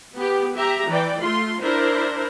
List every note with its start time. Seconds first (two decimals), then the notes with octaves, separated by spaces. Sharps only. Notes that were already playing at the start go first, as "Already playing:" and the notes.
0.15 B3 G4
0.55 G4 E5 A#5
0.88 E3 D5 G5
1.22 A3 F4 C6
1.61 D4 E4 A#4 C5